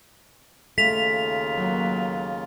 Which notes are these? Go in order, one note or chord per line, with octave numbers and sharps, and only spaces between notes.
D#2 C#3 A3 F4 B6 F7
F#3 A#3